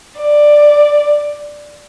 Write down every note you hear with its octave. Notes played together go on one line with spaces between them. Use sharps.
D5